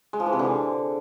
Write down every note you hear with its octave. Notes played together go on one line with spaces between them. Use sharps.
G#3
F3
E3
C3
D3